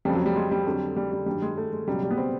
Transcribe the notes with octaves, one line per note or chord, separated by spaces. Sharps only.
F2 C#3 F3 G3
F#3
G3
G#3
G3
F2 D3 F#3
G3
G3
G2 D#3 F#3 G3
G#3
A3
G#3
C#2 B2 F#3 G3
G3
B3
C4